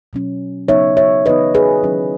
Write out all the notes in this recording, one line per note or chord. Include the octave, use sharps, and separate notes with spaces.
B2 F#3 C#4
C#3 F#3 B3 D#4 C#5 E5
C#5 E5
C#3 E3 B3 D#4 B4 D#5
G#4 B4
D#3 F#3 C#4 E4